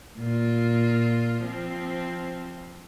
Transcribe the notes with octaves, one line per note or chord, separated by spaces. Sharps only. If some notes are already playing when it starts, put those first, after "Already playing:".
A#2 F4
F3 C4